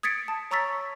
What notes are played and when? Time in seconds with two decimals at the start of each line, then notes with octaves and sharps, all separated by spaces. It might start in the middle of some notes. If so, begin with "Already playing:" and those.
0.03 D#6 G#6 A6 B6 C#7 D7
0.28 A5
0.51 C#5 A#5 C#6 E6 A6 B6